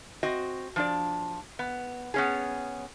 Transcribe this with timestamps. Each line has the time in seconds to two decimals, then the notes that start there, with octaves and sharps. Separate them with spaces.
0.23 C4 F#4 D#5
0.76 F3 D4 D5
1.59 B3
2.14 B3 C#4 G#4